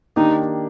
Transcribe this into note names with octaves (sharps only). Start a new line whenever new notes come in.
D#3 A#3 D4 D#4 G4